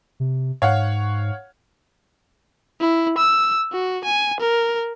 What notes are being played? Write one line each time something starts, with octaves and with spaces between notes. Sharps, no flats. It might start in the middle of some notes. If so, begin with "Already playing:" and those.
C3
G#2 C#5 F5 F#5
E4
E6
F#4
G#5
A#4